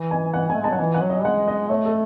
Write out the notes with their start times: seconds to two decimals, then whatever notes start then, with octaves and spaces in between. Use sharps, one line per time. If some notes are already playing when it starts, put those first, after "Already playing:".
Already playing: E3
0.11 G#5
0.34 F#5
0.50 A3 G#5
0.61 G#3 A5
0.70 F#3 F#5
0.79 E3 G#5
0.94 F#5
1.02 F#3
1.10 D#5
1.24 G#3 F#5
1.48 D#5
1.70 A3 C#5
1.85 A4